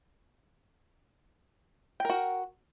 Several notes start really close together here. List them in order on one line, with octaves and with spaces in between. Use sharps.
G5 A#4 F#4